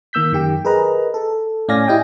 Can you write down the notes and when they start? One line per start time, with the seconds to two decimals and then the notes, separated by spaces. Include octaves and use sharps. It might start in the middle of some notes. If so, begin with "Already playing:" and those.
0.13 D#3 A#3 E6 G6 B6
0.32 F#2 D#3 G4 G5
0.65 G#4 A#4 B4 D#5 A#5
1.14 A4
1.68 A2 C#4 D5 F5 G#5 A#6
1.87 E4 G4 D#5 G5 G#5